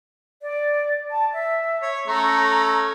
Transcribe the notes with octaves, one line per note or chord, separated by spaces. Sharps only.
D5
A5
E5
C#5
A3 C#4 A#5